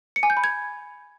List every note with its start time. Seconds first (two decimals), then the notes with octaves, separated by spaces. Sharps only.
0.16 C#7
0.23 G#5
0.30 G6
0.37 B5
0.44 G#6